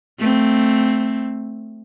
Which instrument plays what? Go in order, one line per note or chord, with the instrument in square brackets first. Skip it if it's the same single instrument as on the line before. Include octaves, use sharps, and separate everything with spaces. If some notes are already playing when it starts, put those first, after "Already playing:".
[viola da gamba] A3 C4